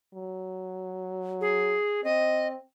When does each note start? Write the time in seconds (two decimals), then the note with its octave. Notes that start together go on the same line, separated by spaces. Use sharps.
0.14 F#3
1.41 G#4
2.04 C4 D#5